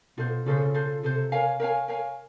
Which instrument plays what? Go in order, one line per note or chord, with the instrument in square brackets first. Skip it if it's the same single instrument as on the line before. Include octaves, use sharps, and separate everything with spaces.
[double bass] B2 [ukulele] F4 A4 C5
[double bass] C#3 [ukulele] F4 A4 C5
[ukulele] F4 A4 C5
[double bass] C3 [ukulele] F4 A4 C5
[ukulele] A#4 C#5 F5 G#5
A#4 C#5 F5 G#5
A#4 C#5 F5 G#5